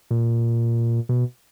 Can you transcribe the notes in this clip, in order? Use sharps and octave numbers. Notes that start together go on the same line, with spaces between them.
A#2
B2